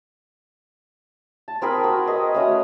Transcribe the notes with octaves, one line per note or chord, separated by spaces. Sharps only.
A5
C4 G#4 A#4 B5
F#4
G#4 B4 D#5
A3 C#4 F#4 D#6